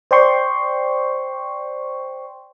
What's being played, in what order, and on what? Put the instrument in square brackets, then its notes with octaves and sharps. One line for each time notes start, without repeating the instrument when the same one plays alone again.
[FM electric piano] C5 D5 G5 C6 C#6